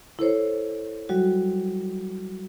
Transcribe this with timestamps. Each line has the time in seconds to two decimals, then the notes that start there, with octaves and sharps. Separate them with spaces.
0.19 E4 A4 C5 C#5
1.09 F#3 G3 F#4